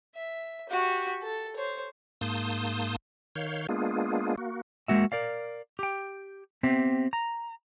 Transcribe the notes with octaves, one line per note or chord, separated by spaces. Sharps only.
E5
F#4 G4
A4
C5 C#5
G#2 A#3 A5 C6 D#6 G6
D#3 C#5 F5 G6
G#3 A#3 B3 D4 F4 G#4
A#3 F#4
G#3 A#3 F#4 E5
A#4 D5 F5
G4 G5
B3 C4 G4 E5
A#5